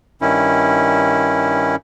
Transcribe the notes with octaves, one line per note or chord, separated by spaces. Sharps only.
G2 D#3 C#4 E4